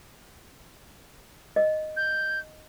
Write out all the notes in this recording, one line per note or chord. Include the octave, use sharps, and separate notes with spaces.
D#5
G6